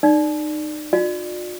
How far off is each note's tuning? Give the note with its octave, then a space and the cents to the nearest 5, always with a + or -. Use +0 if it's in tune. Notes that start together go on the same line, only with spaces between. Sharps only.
D#4 -30 D5 +0
F4 +45 D5 +25